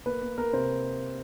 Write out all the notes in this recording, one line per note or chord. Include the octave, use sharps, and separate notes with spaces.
A#3 B4
A#3
A#3 A#4
C3 C5